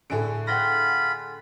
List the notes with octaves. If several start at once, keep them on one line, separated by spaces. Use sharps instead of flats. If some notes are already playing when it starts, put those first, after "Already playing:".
A2 D3 G#4 A4 D7
F4 F#5 G5 B5 A#6